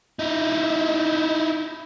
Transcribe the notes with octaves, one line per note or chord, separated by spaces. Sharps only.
D#4 E4